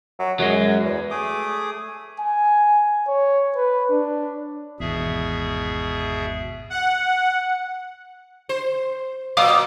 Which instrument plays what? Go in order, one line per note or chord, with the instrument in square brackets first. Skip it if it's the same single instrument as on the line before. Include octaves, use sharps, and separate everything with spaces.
[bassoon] F#3
[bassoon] F#2 [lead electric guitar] F#3 G#3
[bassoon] E2
[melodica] A3 G#4 D6 D#6
[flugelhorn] G#5
C#5
B4
D4
[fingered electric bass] G#1 E2 [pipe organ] B2 G#4 E5
[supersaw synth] F#5
[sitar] C5
[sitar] A#2 F#3 [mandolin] F5 D6 D#6